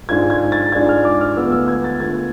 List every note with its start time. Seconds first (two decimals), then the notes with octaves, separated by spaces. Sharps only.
0.09 G#2 G#3 D4 F4 G#6
0.30 G#6
0.52 A6
0.72 G#2 G#3 D4 F4 G#6
0.89 F6
1.05 D6
1.21 F6
1.37 D2 D3 G#3 B3 F4 E6
1.52 E6
1.68 G#6
1.84 A6
2.00 D2 D3 G#3 B3 F4 G#6